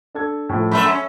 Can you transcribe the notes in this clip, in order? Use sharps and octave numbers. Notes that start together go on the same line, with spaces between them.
D4 A4 G#6
A2 F3 A3
F#2 A3 E5 B5
C#4